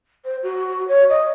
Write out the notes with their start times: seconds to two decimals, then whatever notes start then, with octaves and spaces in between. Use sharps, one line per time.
0.25 C5
0.43 F#4
0.88 C#5
1.10 D#5